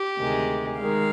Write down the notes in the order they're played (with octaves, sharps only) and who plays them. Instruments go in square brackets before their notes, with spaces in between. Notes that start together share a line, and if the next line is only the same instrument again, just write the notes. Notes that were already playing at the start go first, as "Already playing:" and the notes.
Already playing: [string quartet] G4
D2 C3 D#3 G#3
D#3 G#3 F5